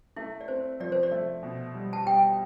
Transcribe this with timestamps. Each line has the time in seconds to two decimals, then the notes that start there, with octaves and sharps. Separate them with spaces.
0.16 A3 E4
0.41 D5
0.48 C4 C5
0.80 F3 D5
0.92 C5
1.03 D5
1.11 A3
1.43 B2
1.74 G3
1.93 A5
2.06 G3 G5